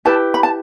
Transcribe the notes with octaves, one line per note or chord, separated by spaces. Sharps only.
E4 G4 B4 A5
B5
A5